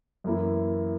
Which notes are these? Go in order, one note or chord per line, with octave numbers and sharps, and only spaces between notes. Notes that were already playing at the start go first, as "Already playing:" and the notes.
F#2 E3 A#3 E4